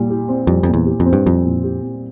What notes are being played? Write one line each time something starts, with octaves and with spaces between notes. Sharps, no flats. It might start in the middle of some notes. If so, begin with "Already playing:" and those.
Already playing: A#2 G3
G4
C4
F2 G3
F2 A#2
E2
G4
F2
C4
G2
F2 G3
A#2
G4
C4